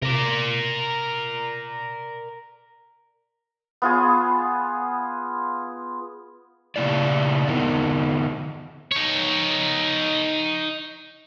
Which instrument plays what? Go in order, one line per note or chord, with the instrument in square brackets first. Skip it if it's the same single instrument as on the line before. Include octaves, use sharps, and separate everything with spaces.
[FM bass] C3 [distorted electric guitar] A#4 D5
[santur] B3 F4 G#4
[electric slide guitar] C#3 A3 A#3 E4 D5
D3 B3 C4 D#4 A#4
[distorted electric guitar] D#4 C#5